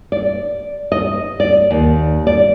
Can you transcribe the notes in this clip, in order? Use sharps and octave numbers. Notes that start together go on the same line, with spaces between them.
D5
D#5
D5
D#2
D5